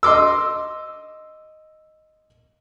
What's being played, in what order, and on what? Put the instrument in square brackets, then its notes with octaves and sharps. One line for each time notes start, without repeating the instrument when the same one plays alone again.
[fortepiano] D#5 C6 D6 E6